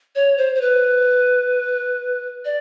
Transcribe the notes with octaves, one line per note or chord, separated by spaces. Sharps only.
C#5
C5
C5
B4
D5